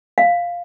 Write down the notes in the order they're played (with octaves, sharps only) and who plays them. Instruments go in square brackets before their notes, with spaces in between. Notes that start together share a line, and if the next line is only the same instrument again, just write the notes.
[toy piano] F5